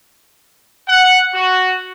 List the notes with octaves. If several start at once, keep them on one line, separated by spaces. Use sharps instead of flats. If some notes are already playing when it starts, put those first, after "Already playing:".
F#5
F#4